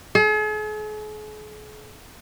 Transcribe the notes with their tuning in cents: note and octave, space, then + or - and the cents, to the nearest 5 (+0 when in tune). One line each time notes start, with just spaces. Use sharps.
G#4 +45